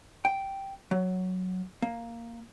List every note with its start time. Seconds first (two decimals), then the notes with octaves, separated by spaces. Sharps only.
0.25 G5
0.91 F#3
1.82 A#3